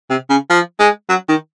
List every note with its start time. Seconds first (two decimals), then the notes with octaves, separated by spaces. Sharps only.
0.10 C3
0.30 C#3
0.50 F3
0.79 G#3
1.09 F#3
1.29 D#3